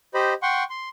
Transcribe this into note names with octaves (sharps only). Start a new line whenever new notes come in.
G4 C5 D#5 B5
F#5 G5 C6 C#6
C6